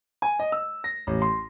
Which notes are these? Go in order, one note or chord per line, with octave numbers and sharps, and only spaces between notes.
G#5
D#5
E6
A#6
A1
C6